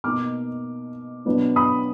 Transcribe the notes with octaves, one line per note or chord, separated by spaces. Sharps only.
B2 A#3 D#4 D6 F6
B2 F#3 B3 D4
B5 D#6